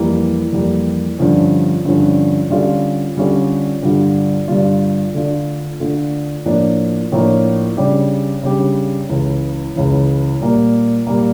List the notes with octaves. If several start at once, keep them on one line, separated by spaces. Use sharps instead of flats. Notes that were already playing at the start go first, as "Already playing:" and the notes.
Already playing: F2 E3 G3 A#3
F2 E3 G3 A#3
G2 D3 F3 C#4
G2 D3 F3 C#4
D3 G3 C#4 F4 A4
D3 G3 C#4 F4 A4
G2 D3 G3 D4 F4
G2 D3 G3 D4 F4
D3 A3 D4 F4
D3 A3 D4 F4
A2 F3 A#3 D4
A2 F3 A#3 D4
C#3 G3 D4 G4
C#3 G3 D4 G4
C#2 C#3 E3
C#2 C#3 E3
A#2 G3 A#3
A#2 G3 A#3